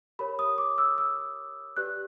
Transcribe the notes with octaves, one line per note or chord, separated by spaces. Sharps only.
G4 A#4 C#5 B5
D#6
D6
E6
E6
G4 B4 D5 F#6